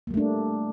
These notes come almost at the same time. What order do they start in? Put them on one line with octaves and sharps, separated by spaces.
A#3 G3 A3 D4